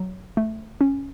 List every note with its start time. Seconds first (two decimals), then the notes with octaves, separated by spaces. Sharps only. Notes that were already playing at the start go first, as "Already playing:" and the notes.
Already playing: F#3
0.37 A3
0.81 C#4